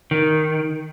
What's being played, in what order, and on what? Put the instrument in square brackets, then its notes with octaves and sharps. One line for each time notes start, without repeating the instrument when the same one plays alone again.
[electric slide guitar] D#3